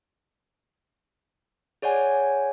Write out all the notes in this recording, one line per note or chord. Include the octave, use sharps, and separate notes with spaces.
G#4 C#5 D5 F#5 G#5